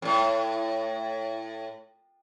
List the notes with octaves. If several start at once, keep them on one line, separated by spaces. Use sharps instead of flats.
F2 A2